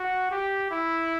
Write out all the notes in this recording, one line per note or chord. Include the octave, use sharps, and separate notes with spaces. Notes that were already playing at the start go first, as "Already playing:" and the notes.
Already playing: F#4
G4
E4